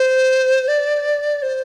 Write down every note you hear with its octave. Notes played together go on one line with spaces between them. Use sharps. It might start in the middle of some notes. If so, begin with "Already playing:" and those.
Already playing: C5
D5
C5